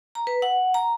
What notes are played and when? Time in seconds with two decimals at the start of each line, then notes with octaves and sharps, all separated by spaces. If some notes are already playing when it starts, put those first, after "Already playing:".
0.15 A#5
0.27 B4
0.42 F#5
0.74 A#5